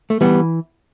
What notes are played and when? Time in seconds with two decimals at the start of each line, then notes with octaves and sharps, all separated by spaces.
0.10 A3
0.21 E3 G3 B3